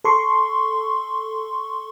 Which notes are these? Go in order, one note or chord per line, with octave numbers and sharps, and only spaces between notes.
A4 C6 C#6